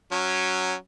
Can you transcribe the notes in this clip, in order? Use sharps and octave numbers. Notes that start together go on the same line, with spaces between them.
F#3 C#4